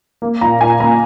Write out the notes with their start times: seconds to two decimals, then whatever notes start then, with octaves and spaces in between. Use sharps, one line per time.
0.22 A#3
0.41 A#2 A#5
0.60 A#2 G#5
0.80 A#3 A#5